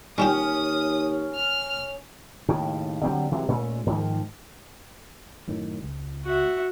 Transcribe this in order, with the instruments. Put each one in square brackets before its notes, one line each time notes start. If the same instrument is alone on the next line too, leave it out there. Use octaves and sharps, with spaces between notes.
[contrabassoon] D#2 [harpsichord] G3 F4 G4 [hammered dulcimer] C#4 [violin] D#6
[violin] F6
[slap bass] D#2 A2 C#3
D3 F#3 G3 C4
C3 E3 F#3 G#3
A#2 G#3 A3 C#4
G#2 D#3 F3 A#3
[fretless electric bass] F#2 A2 D#3
C#2
[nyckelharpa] F#4 E5